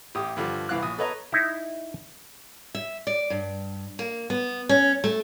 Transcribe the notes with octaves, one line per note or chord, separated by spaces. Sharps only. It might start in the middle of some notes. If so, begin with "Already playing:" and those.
A1 G4 D#6
G2 D3 F3 G3
C2 E3 F5 D6 F#6
A#1 D#6
A4 B4 C#5 D#5 A#5
D#4 E4
E5
D5
G2
A#3
B3
C#4
A3